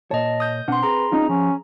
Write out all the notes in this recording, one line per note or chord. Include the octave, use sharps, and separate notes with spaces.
A#2 C#5 D#5 A5
D#6 G6
B2 C4 D4 F#5 C6
G#4 B4 A#5
C4 C#4 D#4 F4
F3 C#4